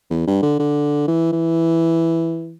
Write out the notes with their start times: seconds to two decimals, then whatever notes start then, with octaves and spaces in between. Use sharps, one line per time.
0.10 E2
0.28 G2
0.43 D3
0.59 D3
1.08 E3
1.33 E3